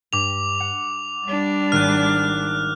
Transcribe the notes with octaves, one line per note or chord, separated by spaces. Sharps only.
G2 D6 F7
F#5
G3 D4
G#1 F6 F#6 D#7